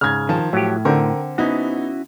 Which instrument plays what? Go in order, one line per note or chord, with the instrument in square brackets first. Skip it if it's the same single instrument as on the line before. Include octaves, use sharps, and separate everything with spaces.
[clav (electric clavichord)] G#2 C#3 [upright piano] F6 G#6
[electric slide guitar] D#3 [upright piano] F3 A5
[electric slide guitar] A2 [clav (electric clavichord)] F#3 G4
[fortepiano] D3 [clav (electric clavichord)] C4 [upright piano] A#4
[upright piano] B3 D#4 [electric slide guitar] C#4 E4 F#4